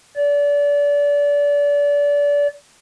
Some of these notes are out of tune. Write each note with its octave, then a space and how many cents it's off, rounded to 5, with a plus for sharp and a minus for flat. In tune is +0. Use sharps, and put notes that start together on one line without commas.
D5 -30